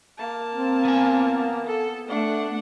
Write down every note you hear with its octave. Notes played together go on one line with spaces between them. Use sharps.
A#3 A5
C4
B3 G#5
A4
A3 D4 F#5